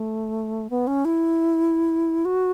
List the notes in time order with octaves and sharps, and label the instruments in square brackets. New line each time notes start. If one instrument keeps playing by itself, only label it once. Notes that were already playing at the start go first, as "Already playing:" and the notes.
Already playing: [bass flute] A3
B3
C#4
E4
F#4